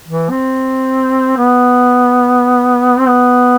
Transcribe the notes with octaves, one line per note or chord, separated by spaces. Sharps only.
E3
C4
B3
C4
B3